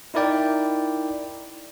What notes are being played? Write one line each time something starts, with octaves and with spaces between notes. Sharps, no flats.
D#4 E4 A#4 D5 G5